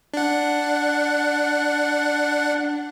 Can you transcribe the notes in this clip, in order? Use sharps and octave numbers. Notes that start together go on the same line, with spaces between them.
D4 F#5